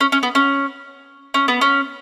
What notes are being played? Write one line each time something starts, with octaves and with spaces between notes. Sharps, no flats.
C#4
C#4
B3
C#4
C#4
B3
C#4